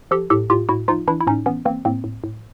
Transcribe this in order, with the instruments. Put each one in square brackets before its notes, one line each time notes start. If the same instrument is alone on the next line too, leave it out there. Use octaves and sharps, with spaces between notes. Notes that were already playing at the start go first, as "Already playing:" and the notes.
[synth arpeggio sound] F3 G4 A4
A2 G4 A4
A2 F4 G4
A2 E4 F#4
F3 D#4 F4
E3 D4 E4
E4
A2 C#4 D#4
E3 B3 C#4
E3 A#3 C4
A2 A#3 C4
A2
A2